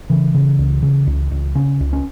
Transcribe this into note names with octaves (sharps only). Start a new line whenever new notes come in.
C#3 E3
C#3
C#2
C#3
C#2
C#2
C#3 C#4
C#2
C#4